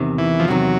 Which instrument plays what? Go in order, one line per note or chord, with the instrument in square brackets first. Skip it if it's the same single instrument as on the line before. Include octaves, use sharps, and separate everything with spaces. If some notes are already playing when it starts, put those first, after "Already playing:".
Already playing: [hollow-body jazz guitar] E2 C3 D#3
[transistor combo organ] E3
F3
[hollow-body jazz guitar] E2 C3 D#3 [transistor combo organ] F#3